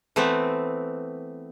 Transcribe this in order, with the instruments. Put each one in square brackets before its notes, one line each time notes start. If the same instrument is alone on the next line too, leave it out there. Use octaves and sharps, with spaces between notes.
[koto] E3 A3 B3 C4